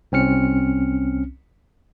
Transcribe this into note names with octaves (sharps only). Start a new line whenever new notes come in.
C2 C4 C#4 F6 C#7